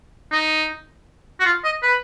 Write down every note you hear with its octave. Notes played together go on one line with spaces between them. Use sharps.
D#4
F#4
F4
D#5
B4